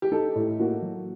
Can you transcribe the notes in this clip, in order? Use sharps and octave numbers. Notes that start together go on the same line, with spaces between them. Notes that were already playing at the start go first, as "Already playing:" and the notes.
G4
D#4 A4
A2
A#3 F#4
F#3